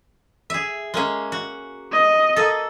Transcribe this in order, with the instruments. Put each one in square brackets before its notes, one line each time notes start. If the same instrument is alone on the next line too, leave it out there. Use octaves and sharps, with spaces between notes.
[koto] G#4 E5
G#3 A#3 C#4
F#4
[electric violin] D#5
[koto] A#3 A4